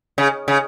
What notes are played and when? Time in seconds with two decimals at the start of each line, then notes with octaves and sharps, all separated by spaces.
0.18 C#3
0.48 C#3